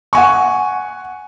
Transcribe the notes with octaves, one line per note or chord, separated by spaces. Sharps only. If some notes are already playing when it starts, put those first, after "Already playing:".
F#5 G#5 C#6